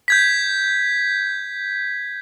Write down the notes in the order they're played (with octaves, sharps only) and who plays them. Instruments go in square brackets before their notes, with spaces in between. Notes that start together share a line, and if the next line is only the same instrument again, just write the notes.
[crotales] G6 G#6 B6